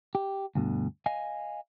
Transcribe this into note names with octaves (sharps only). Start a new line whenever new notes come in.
G4
D2 G2 B2 D3
D#5 F5 G#5